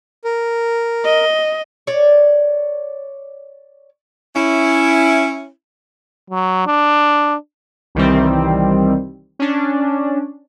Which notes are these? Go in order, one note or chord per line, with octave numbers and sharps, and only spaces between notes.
A#4
D#5
C#5 D5
C#4 E4
F#3
D4
C2 D#3 E3 G3 C4
C#4 D4